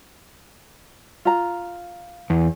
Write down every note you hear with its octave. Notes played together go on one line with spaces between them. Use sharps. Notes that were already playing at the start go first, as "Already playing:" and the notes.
F4 A#5
E2